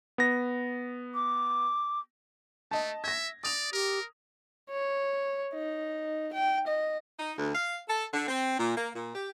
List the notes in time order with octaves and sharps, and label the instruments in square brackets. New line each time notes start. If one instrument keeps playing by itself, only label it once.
[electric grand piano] B3 A#6
[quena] D6
[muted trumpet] A3 [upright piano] D#5 A5
[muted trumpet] E5 [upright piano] G#6 A#6
[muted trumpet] D5 [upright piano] D#6 F7
[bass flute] G4 [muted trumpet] A#4
[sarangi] C#5
D#4
G5
D#5
[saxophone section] D#4
D2
F5
A4
D3
C4
A#2
A#3
A#2
G4